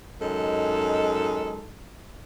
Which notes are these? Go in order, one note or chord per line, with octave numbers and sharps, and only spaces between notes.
F#2 G#3 D#4 A4